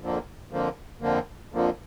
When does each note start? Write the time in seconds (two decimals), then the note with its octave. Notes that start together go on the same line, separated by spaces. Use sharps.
0.01 F2 D3 F3 A#3
0.51 F2 D3 F3 A#3
1.01 F2 D3 F3 A#3
1.53 F2 D3 F3 A#3